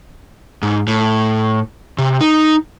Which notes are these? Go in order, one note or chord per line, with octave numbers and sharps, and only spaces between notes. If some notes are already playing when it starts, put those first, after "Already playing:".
G#2
A2
C3
D#4